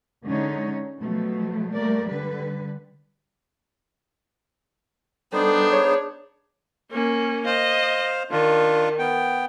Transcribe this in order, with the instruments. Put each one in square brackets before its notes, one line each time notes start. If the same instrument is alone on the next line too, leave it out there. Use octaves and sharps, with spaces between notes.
[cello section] D3 G#3 C#4 D#4 C#5
B2 F3 F#3 A3
G3 A3 A#3 A#4 D5
D3 G3 B4
[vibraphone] G3 A4 [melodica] B3 D#4 C5 [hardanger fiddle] D4
[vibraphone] G#4 [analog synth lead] C#5
[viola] A#3 C#4
[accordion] C5 F5 [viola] D#5
[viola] D#3 [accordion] D4 F4
[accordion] B3 G5